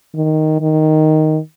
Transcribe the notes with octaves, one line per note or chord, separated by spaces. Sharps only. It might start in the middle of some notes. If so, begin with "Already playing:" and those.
D#3
D#3